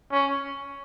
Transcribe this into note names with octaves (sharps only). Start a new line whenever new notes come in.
C#4